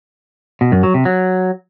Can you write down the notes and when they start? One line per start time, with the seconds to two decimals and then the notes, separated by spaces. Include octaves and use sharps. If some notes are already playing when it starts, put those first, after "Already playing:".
0.61 B2
0.72 F#2
0.83 F#3
0.94 C3
1.05 F#3